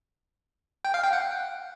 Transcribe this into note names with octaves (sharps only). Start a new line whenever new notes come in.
G5
F5
G5
F#5